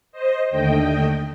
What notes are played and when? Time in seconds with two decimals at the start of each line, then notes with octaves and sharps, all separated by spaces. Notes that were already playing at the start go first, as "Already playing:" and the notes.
0.12 C5 D#5
0.50 D#2 D3 A3 D#5 G5